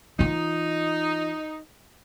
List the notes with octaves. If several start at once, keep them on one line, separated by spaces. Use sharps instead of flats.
E3 D#4 F4